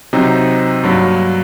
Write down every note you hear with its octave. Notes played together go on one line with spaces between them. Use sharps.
C3 F#3 C4 D#4
G2 F#3 A#3